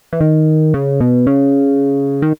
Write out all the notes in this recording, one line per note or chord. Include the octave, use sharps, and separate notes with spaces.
E3
D#3
C#3
B2
C#3
D#3